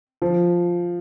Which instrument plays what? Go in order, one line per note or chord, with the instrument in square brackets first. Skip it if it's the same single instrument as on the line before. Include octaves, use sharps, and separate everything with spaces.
[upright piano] F3